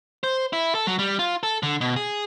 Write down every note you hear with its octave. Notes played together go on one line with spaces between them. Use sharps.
C5
E4
A4
F#3
G3
F4
A4
D3
B2
G#4